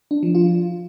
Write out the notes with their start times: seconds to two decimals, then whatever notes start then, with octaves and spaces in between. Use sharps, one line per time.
0.11 D4
0.23 F3
0.35 F4